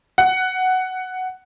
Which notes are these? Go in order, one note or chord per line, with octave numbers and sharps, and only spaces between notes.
F#5